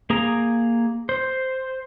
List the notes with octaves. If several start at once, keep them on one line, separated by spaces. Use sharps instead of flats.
A#3 G#4 A#5
C5